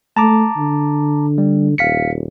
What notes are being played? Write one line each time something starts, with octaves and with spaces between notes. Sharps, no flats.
A3 A5 A#5 D6
D3
G3
D#1 F5 B6 C#7